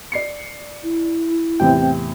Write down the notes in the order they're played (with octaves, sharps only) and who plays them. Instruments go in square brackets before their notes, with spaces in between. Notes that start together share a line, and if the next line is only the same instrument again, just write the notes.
[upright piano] D5 C7 C#7
[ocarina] E4
[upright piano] E2 A2 C3 [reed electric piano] C4 G5